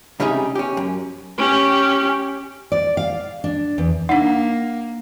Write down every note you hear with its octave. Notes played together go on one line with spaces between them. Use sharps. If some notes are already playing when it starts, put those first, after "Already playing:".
C3 G3 C#4 D#4 G4 G#4
C#4 G4
F#2
C#4 G4
D5
F5
D4
E2
A#3 D4 D#4 F#5